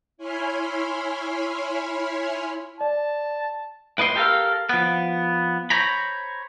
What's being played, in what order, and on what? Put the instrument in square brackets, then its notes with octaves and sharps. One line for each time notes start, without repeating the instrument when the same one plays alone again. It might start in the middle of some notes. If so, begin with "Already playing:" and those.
[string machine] E4 C#5 G#5 B5 C6 F6
[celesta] D5 [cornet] A5
[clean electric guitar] A2 B4 D#5 C6
G4 A4 A#4 F5
F3 B3
C5 C#5 A#5 B5